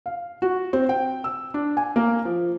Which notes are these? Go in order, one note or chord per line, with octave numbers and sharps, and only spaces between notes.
F5
F#4
C4
G5
E6
D4
G#5
A#3
F3